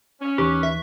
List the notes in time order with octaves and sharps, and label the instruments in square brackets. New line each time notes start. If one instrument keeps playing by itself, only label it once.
[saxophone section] C#4
[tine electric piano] D#2 E3 D#4 [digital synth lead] G4 [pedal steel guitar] B4 C#6 F#6
[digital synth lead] E5